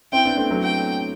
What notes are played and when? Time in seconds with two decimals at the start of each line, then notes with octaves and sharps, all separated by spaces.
0.12 C4 E4 G5
0.25 B3 D4
0.37 A3 C4
0.51 F#3 A3
0.63 G5